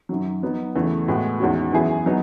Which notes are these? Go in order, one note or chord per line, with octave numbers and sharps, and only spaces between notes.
F#2 D#3 F#3
F#3 B3 D#4
E2 C#3 E3 A3
A2 G#3 B3 F#4
E2 D#3 G#3 C#4 F#4
F#2 E3 B3 E4 G#4
F#3 B3 D#4